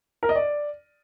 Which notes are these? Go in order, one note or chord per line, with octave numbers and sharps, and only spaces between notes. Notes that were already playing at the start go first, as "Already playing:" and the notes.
A#4
D#5
D5